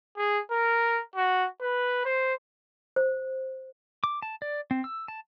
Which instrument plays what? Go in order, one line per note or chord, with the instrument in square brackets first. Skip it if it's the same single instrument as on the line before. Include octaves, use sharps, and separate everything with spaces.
[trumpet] G#4
A#4
F#4
B4
C5
[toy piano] C5
[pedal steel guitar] D6
A5
D5
C4
E6
A5